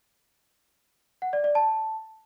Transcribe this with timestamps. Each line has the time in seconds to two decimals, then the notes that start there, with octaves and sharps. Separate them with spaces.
1.22 F#5
1.33 D5
1.44 D5
1.55 A5